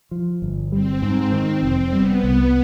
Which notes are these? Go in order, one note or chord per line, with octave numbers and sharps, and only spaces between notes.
F3
G1
G3 C4
G#2
D#3
F1
G3 B3
C2